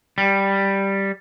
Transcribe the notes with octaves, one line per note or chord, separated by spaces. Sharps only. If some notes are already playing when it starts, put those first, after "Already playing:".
G3